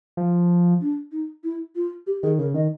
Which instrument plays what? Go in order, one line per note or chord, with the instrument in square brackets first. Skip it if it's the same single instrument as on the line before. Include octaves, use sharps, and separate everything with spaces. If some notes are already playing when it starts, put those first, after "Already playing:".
[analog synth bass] F3
[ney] D4
D#4
E4
F4
G4
[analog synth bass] D#3 [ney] G#4
[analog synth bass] C#3 [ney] A#4
[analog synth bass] D#3 [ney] D#5